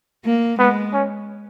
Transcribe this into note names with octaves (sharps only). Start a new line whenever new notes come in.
A#3
G#3 B3
C#4